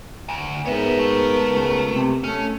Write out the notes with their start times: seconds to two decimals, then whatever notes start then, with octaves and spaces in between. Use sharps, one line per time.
0.29 D2
0.66 G#2 B3 A#4 C#5 E5
0.99 A3
1.46 C#2
1.90 C3
2.24 A3 C#4